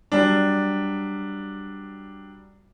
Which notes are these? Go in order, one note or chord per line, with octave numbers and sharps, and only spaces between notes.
F#3 G3 D4